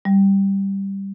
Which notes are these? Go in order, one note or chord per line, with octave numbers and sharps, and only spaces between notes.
G3